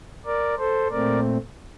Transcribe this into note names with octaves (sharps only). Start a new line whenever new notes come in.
A#4 D5
A4 C5
A#2 A3 C4 A#4 D5